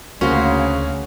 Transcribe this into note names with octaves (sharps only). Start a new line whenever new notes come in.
D2 C#3 A#3 C#4 F#4 C5